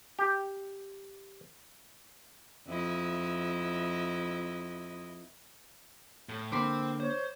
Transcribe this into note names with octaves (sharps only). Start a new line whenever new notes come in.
G4
F2 E4 D#5
A2
D3 A#3 C5 G5 B5 C6 D6
C5 C#5